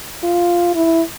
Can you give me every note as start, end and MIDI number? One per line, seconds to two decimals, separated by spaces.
0.23 0.71 65
0.75 1.02 64